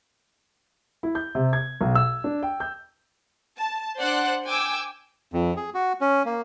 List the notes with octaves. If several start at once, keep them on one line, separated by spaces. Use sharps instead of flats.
E4
G6
C3
G#6
B1
E6
D4
G5
G6
A5
D4 C5 D5 F#5 F#6
G5 G#5 D6 E6
F2
G#4
F#4
C#4
A#3